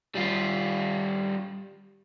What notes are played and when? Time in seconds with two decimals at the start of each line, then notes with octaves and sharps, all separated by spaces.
0.15 G3 F4